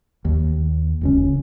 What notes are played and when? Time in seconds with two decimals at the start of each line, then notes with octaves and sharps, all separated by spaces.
0.25 D#2
1.01 E1 C#2 C#4